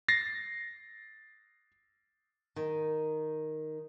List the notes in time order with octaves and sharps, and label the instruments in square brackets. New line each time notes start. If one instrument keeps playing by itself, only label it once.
[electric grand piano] A6 A#6 C7
[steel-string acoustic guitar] D#3